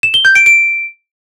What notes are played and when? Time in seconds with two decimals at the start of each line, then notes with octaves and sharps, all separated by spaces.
0.03 E7
0.14 G7
0.25 G6
0.35 D7
0.46 D7